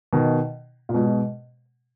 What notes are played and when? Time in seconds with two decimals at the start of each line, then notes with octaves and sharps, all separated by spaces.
0.13 B2 D#3
0.89 A#2
0.94 G#2 B2